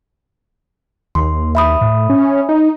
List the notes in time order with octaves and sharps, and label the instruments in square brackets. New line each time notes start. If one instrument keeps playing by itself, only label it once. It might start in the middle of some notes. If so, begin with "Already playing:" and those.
[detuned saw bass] D#2 [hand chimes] C6
[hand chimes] E5 B5 D#6
[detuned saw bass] A2
C#4
D#4